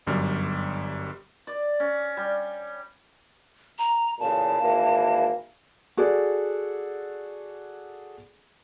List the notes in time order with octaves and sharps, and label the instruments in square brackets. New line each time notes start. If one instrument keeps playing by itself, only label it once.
[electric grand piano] G1 F#2 G3 F6
[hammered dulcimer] D5
C#4
G3
[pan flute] A#5
[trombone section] A1 A#2 C#3 [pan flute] A5
[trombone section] G#1 E3 A#3
[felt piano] F#4 G#4 A4 D5